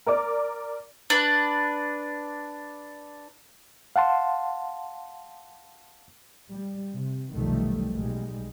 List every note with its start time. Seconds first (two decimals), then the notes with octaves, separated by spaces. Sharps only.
0.06 A#4 D5 D6
1.10 D4 B4
3.96 F5 F#5 A5 C6
6.50 G3
6.94 C3
7.34 F1 B1 D#3 F3 G3 A3
7.94 B1 G3 G#3